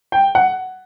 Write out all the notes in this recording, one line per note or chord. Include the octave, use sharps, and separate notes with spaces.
G5
F#5